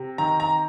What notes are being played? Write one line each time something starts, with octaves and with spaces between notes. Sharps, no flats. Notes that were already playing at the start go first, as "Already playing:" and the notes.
Already playing: C3
D#3 A#5
A#5